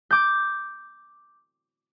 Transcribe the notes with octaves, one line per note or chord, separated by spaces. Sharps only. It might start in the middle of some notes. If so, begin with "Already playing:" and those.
D6 G6